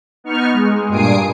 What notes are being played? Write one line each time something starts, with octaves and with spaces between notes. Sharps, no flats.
B3 D#4 C#6 F6
G#3
G2 A#2 G#5 D#6 C7 D7